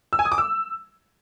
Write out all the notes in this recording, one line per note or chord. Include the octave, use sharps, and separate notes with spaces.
E6
G#5
D#6
D6
E6